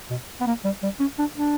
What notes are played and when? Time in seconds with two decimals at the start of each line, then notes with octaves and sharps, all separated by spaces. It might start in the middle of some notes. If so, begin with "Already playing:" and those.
0.10 B2
0.41 B3
0.47 A#3
0.65 G3
0.83 G3
1.00 C#4
1.19 D4
1.36 D4